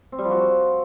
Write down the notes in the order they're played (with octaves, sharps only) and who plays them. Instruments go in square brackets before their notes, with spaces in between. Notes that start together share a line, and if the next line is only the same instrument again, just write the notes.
[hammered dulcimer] C4
G3
F3
F#4